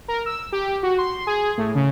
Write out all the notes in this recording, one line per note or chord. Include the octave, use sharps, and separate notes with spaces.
A#4
E6
G4
F#4
C6
G#4
A2
C#3